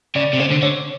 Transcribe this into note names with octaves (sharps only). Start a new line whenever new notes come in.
C#3 D5
C3
C#3 C5
D3
D3 C#5